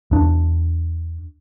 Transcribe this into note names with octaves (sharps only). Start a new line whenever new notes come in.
E2 D4